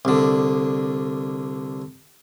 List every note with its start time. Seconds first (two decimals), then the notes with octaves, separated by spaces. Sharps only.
0.05 C2 D3